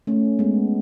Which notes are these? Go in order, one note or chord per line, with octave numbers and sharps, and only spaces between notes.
A3 C#4
G#3 B3